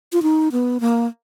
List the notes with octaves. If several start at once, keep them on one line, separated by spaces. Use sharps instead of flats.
F4
D#4
B3
A#3